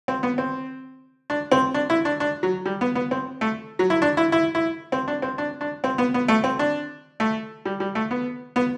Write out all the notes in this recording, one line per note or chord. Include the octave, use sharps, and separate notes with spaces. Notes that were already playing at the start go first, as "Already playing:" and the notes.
C4
B3
C4
D4
C4
D4
E4
D4
D4
F#3
G3
B3
B3
C4
A3
F#3
E4
D4
E4
E4
E4
C4
D4
C4
D4
D4
C4
B3
B3
A3
C4
D4
A3
G3
G3
A3
B3
B3